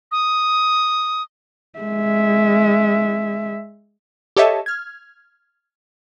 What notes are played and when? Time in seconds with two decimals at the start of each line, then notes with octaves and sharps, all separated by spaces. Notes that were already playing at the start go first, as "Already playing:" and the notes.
0.12 D#6
1.80 G#3 E5
4.37 G4 A4 C#5 D#5 E5 A5
4.66 F6 G#6